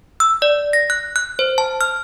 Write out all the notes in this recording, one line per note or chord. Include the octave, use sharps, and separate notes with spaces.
E6
D5
A#6
F#6
F#6
C5
A5
F6